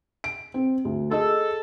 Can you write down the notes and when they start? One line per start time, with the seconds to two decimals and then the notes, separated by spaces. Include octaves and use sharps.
0.24 D7
0.54 C4
0.85 D2
1.11 G#4 A4 D#5 E6